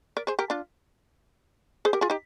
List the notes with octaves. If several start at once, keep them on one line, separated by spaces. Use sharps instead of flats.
A#4 D5
G#4 C5
G4 A#4
D4 F4
G#4 C5
G4 A#4
F4 G#4
D#4 G4